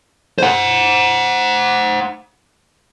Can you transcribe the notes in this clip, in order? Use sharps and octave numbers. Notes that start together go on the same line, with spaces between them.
C5 F#5